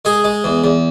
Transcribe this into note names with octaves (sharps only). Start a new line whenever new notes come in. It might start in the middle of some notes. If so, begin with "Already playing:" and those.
G#3 G#4
G#3
E2
E2